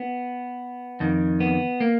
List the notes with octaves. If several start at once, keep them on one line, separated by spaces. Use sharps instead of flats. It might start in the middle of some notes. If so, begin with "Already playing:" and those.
Already playing: B3
F2 D#3
B3
A#3